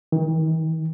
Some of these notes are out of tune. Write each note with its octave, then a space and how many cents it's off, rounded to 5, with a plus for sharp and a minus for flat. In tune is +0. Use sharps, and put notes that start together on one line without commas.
D#3 +45